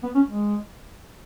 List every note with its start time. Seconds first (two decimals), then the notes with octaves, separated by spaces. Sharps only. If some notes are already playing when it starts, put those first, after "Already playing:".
0.03 B3
0.15 C#4
0.28 G#3